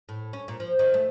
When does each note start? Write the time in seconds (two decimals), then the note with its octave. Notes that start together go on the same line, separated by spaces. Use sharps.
0.09 A2
0.33 C#4
0.48 A#2
0.60 F3
0.79 D#3
0.94 A3